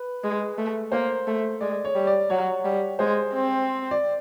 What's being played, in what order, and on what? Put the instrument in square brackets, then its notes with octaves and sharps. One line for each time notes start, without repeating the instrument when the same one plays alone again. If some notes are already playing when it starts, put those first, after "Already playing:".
Already playing: [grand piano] B4
[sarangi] G#3
A3
[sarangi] A#3 [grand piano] C5
[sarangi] A3
[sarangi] G#3 [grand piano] D5
[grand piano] C#5
[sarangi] G3
[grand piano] D5
[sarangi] F#3 [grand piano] C#5
[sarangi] G3
[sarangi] G#3 [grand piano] C5
[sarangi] C4
[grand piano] D5